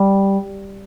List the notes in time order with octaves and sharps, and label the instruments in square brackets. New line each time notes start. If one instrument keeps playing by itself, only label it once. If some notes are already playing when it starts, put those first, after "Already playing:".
Already playing: [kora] G3